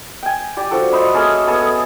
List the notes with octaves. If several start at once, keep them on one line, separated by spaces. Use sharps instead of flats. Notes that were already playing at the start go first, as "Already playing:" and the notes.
G5 G#5
G4 D5
F3 D4 F#4 A4
C5 D#5 E5 B5
A#3 C#4 G#4 A4
B3 G#4 A4